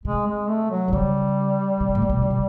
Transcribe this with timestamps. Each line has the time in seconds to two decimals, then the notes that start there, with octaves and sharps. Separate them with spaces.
0.05 C3 G#3
0.27 G#3
0.48 A3
0.71 F#3
0.88 C3
0.92 C#3 G3
1.81 C3
1.95 A2
2.02 A#2
2.10 B2
2.22 C#3
2.30 C3